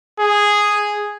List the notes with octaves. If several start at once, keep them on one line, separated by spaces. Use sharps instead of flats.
G#4